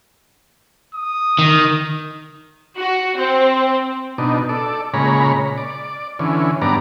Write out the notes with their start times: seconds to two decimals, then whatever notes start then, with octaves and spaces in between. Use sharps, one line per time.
0.94 D#6
1.39 D#3
2.77 F#4
3.17 C4
4.18 B2 D4 D#4
4.49 A4 D5
4.94 A#2 C#3 G#3 C#5 A#5 B5
5.58 D5
6.19 D3 E3 C#4
6.62 G2 B3 D4 D5 A#5